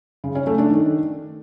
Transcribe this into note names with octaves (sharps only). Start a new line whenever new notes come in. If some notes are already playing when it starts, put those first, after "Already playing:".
C#3
C#4
A3
D4
D#3